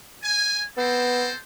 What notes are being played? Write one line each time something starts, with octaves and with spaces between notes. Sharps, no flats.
G#5
B3 C4 A4 C5